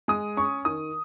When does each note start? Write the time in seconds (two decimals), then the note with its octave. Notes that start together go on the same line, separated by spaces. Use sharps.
0.08 G#3 D#6
0.37 C#4 C#6
0.65 D#3 D#6